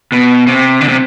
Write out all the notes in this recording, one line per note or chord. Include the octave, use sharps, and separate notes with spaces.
B2
C3
D3
C3